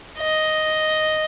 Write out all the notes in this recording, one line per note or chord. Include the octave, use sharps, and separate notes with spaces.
D#5